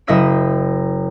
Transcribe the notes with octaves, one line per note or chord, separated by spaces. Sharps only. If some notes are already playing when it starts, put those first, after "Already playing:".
F#1 E4 D#5 E5 E6 D#7